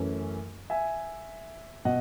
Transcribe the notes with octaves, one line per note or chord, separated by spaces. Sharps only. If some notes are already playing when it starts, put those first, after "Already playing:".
Already playing: F#2 E3 A3 C#4
E5 G#5
B2 D#5 F#5